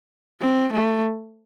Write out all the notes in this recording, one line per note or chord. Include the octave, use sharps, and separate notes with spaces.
C4
A3